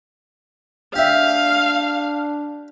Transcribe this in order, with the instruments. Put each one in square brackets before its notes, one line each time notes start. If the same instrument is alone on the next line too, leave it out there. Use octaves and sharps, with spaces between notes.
[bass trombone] D4 [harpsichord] G4 E5 [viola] F5